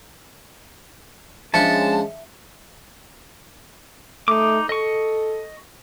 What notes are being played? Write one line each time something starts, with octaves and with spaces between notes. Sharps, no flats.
F3 G#3 C#4 D4 E5 A5 C#7
A3 D#4 D6
A4 D#5 C#6